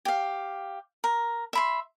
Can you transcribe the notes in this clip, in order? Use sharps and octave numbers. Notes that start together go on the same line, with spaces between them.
G4 F5
A#4
E5 B5 C6